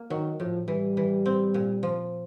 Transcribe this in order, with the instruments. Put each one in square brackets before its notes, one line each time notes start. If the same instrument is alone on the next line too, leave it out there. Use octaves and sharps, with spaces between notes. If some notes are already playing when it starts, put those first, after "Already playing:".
Already playing: [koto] A#3
[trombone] D#3 [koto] F#3
[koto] A2 [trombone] F3
[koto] E3 [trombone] G3
[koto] E3
C4
A#2
F3